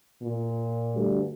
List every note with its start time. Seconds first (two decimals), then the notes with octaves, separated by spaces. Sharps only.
0.22 A#2
0.95 D2 G2 D3